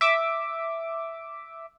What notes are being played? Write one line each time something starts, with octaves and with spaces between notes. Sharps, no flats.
E5 D6